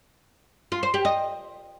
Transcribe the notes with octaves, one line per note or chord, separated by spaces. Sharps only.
F4
C5
G4
D#5